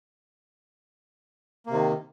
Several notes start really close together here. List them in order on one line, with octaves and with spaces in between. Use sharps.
A#3 C3 D#3